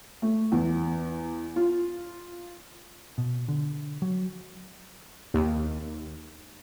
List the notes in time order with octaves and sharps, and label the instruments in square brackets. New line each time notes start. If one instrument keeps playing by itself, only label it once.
[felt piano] A3
E2
F4
[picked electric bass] B2
D3
F#3
[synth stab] D#2